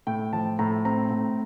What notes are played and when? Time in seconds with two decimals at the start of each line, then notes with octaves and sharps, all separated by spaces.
0.07 A2 G5
0.33 F3 A5
0.59 A2 A#5
0.85 C4 A#5
1.11 A2